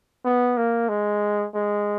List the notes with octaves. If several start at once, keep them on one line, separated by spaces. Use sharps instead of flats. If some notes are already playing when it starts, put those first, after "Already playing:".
B3
A#3
G#3
G#3